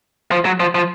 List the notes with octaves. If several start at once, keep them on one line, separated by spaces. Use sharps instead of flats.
F3
F#3
F3
F3